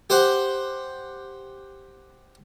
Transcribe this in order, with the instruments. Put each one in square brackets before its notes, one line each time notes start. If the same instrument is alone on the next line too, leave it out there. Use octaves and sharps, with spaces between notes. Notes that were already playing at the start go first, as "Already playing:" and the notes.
[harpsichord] G4 C5 F#5